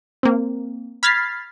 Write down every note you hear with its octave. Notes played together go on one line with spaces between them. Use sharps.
A#3 C4
B5 F6 G#6 A6 B6 C7